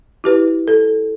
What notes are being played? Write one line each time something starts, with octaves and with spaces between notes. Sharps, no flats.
E4 G4 B4
A4